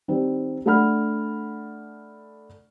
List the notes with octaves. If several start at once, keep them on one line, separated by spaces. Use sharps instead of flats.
D#3 G3 C4
A3 D4 F#5 B5 F6